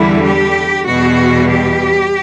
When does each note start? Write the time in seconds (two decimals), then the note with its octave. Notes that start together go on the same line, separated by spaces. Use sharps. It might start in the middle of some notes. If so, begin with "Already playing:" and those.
Already playing: E2 D3 G3 E4
0.23 G4
0.86 E2 B2 G3 F#4
1.50 G4